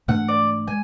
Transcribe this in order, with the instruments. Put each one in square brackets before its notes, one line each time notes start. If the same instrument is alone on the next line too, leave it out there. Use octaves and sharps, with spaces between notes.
[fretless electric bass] G#2 E3 A3 D4 [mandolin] F#5
[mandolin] D5
[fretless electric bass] G#3 [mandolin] G#5